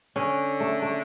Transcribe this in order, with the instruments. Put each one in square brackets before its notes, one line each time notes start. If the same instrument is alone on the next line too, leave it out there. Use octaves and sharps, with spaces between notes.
[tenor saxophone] D3 [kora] C#4
[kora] A3
A3